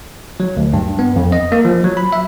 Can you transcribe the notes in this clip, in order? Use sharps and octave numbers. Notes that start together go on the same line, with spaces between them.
F#3
D2
G2
B3
F2
D#5
A#3
F3
F#3
B5
E5